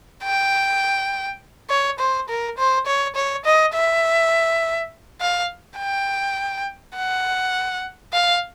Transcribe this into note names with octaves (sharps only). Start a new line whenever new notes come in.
G5
C#5
C5
A#4
C5
C#5
C#5
D#5
E5
F5
G5
F#5
F5